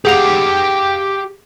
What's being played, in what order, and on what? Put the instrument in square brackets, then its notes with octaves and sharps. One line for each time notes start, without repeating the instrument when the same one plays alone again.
[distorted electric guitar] G4 F5 [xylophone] G#4 F#5 F7